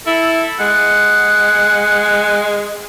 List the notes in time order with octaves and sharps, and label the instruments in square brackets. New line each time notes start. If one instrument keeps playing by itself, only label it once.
[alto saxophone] E4 [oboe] A4
[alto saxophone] G#3 [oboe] F#5